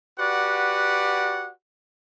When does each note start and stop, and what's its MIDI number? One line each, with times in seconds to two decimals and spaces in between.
0.19 1.50 66
0.19 1.50 67
0.19 1.50 71
0.19 1.50 74
0.19 1.50 78